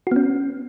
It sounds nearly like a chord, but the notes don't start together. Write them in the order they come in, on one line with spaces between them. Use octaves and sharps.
F#4 B3 C#4